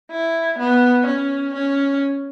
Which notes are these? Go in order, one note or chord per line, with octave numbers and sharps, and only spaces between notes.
E4
B3
C#4
C#4